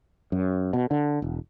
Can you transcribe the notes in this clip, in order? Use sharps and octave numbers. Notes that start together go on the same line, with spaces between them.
F#2
B2
D3
E1